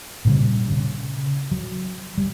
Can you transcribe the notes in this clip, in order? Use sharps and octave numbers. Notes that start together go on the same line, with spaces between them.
A#2 C#3 G3
C#3
F#3
G3